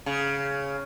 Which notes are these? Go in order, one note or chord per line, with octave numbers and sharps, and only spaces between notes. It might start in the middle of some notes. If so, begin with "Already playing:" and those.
C#3